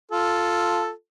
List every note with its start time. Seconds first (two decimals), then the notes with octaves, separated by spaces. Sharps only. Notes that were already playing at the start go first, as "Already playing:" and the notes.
0.11 F4 A4